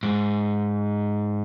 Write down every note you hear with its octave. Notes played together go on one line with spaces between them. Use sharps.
G#2